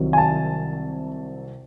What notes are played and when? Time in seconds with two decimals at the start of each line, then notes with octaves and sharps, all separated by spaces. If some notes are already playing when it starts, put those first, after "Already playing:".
Already playing: C2 C3 D#3 F#3
0.13 G#5
0.18 A5